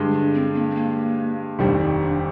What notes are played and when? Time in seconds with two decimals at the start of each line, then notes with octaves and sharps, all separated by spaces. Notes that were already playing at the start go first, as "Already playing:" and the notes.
Already playing: G2 D3 G#3
0.12 D4
0.34 C4
0.54 A#3
0.70 C4
0.75 A#3
1.59 F1 D#2 D#3 G3 D4
1.80 D#4
2.01 D4